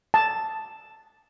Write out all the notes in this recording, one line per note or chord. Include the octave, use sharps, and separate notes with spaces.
A5